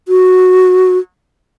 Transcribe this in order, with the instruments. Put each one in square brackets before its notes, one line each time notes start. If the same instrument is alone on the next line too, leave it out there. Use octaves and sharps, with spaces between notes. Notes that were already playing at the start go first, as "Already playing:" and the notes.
[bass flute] F#4